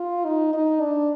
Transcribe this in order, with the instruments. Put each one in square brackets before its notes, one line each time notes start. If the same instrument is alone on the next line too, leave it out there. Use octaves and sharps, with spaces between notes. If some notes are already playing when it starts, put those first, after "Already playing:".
Already playing: [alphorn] F4
D#4
D#4
D4